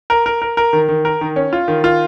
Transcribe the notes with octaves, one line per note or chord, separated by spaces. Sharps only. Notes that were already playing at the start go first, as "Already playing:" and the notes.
A#4
A#4
A#4
A#4
D#3
D#3
A#4
D#3
C#4
F4
D#3
F4